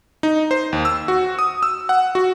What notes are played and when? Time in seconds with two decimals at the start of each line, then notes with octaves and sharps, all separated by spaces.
0.23 D#4
0.51 C5
0.73 D#2
0.85 E6
1.08 F#4
1.39 D#6
1.63 E6
1.89 F#5
2.15 F#4